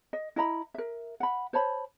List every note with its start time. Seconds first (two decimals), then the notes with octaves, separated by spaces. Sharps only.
0.13 D#5
0.36 E4 D#5 A#5 B5
0.74 A#4 E5
1.20 F#5 B5
1.53 C5 C#5 A5 B5